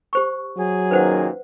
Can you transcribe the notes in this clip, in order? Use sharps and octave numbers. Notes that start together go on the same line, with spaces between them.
G4 C5 C#6
F#3 G#4
F#2 A#2 D#3 B4 C5 F#5